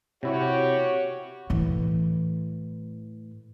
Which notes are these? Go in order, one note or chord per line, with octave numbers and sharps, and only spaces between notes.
C3 E4 F#4 G4 C#5
A2 E3